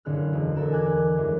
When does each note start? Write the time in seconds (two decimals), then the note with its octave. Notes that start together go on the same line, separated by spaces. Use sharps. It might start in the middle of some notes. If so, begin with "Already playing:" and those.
0.05 F#1 D3 G#4 F6 F#6
0.33 E1
0.55 E1 A4 A#4 E7
0.72 G#5 D6 F#6 G#6
1.16 F#2 E3 G#3